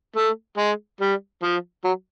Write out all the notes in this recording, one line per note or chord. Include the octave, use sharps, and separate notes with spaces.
A3
G#3
G3
F3
F#3